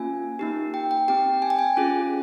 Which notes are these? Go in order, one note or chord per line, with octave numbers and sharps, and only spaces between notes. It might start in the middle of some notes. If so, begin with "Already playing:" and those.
Already playing: A#3 C#4 F4 G#5
A#3 D#4 G4
G5
G5
C4 G4 G5
G#5
G5
G#5
C#4 F4 G#4